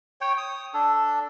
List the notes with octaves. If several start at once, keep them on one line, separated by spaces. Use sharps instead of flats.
C#5 G5
D#6
D4 A4